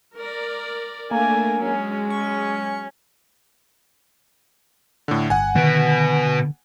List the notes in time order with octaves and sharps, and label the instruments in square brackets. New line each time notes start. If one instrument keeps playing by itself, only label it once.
[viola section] A#4 D5
[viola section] A3 D4 A#4 [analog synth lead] A#3 [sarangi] G#5
[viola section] F#3 G#3 [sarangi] C#4
[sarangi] C#4 [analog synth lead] C#6
[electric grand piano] A2 D3
[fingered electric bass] G1 [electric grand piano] F#5 G#5
[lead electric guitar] B2 B3 [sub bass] D3 [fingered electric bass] D#3